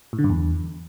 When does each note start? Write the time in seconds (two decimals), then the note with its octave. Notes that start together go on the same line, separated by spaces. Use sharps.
0.13 A2
0.19 D3
0.24 G2
0.30 E2